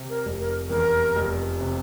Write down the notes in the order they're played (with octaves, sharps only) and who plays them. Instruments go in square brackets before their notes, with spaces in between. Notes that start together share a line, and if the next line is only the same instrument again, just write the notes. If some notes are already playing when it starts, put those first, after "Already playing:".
Already playing: [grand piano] C3
[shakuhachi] A#4
[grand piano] F1
[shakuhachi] A#4
[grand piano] E2 [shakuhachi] A#4
[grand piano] F1
C3